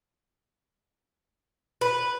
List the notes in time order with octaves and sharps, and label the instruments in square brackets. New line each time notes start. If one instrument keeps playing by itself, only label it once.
[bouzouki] B4